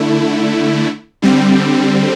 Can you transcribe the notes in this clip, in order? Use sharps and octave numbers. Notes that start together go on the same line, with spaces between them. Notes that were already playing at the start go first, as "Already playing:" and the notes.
Already playing: D3 A3 E4
D3 G3 C4